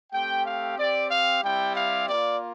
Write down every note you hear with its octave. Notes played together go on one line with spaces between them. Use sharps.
A3 C4 G4 G5
F5
C4 G4 D5
F5
G3 C4 E4 G4 G5
F5
A#3 F4 D5